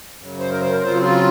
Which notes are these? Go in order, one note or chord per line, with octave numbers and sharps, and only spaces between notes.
F#2 C#3 F#3
C5
A#4
C5
A#4
C#3 F#3 C4 F4 C5
F4